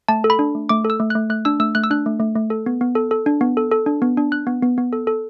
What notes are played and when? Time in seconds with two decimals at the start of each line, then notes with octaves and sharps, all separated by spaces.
0.08 A3 A5
0.24 A4
0.30 B5
0.39 D4
0.55 A3
0.69 A3 D6
0.85 A4
0.90 E6
1.00 A3
1.10 F#6
1.15 A3
1.30 A3 F#6
1.45 D4 E6
1.60 A3 E6
1.75 A3 F#6
1.84 E6
1.91 D4 F#6
2.06 A3
2.20 A3
2.36 A3
2.50 A4
2.66 B3
2.81 B3
2.95 A4
3.11 A4
3.26 D4
3.41 B3
3.57 A4
3.71 A4
3.86 D4
4.02 B3
4.17 D4
4.32 D4 F#6
4.47 B3
4.63 B3
4.78 B3
4.93 A4
5.07 A4